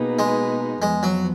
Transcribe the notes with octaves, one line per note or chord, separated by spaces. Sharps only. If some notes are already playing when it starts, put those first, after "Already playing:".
Already playing: B2 A#3 D#4 G#4 B4
G#3
F2 F3 G#3 B3
F#3